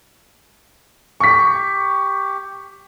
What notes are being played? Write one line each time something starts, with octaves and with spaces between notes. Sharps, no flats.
G4 C#6 B6